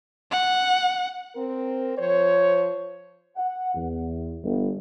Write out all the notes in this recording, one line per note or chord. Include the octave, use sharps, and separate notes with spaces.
F#5
C4 A#4
F3 C5 C#5
F#5
E2
G1